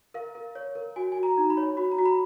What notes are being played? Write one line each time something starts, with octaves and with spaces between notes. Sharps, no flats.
A#4 F5
A#4
C#5
A#4
F#4 G#5
F#4 G#5
A#5
D#4
B5
C#5
F#4 B5
A#5
F#4
B5